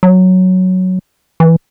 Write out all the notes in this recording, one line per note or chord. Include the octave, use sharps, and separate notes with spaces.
F#3
E3